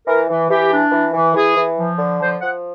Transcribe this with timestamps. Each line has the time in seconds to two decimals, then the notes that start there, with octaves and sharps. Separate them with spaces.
0.07 E3 A#4
0.29 E3
0.49 E3 G4
0.71 D4
0.92 E3
1.13 E3
1.35 E3 G#4
1.56 E3
1.78 F3
1.99 D3
2.19 F3 C5
2.41 F3 F#5